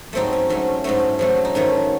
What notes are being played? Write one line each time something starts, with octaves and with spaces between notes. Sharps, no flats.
G#2 F#3 A3 C4 D#4
C#4
G#2 F#3 A3 C#4
G#2 F#3 A3 C#4
G#2 F#3 A3
D#4
G#2 D#3 F#3 A3 C#4